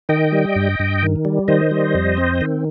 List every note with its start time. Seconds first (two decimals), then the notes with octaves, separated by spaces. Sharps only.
0.09 D#3 D#5 G5
0.32 G3
0.56 G2
0.80 G2
1.03 D#3
1.25 G3
1.48 D#3 C5 D#5
1.71 G3
1.94 F2
2.17 C4
2.41 D#3